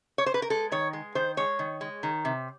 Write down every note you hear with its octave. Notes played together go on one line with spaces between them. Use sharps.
C#5
C5
B4
A#4
G#3 A4
D#3 C#5
G#3
D#3 C5
G#3 C#5
D#3
G#3
D#3
C3